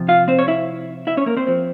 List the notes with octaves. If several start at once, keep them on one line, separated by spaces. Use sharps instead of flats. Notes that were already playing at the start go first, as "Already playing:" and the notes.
Already playing: C3 F3
F4 F5
C4 C5
C#5
E4 E5
E4 E5
C#4 C#5
A#3 A#4
C4 C5
F3 C4